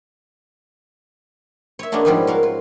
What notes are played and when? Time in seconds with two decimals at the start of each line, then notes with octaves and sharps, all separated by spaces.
1.79 C#5 E5
1.92 G#3 A#3 B3 C#4 D4 F#4
2.05 G#2 F3 G3 B3 C#5 G#5
2.27 F#4 A#4 F5
2.43 F4